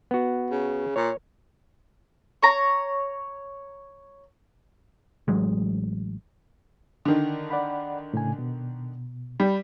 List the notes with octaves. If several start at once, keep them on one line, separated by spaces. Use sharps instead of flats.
B3 F#4
C#3
A#2 C#5
C#5 A#5
A1 F#3 G#3
D3 D#3
D5 F#5 B5
A2 C#3 G#5
B2
G3 B5